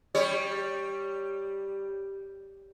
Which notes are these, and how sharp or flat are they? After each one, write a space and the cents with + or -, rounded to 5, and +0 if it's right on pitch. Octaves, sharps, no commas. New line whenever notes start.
G3 +0 G4 +20 C#5 +0